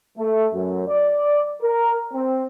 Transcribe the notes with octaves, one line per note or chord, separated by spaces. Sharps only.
A3
F#2
D5
A#4
C4